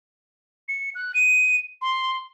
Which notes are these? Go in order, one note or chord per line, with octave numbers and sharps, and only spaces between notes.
C#7
F#6
D#7
C6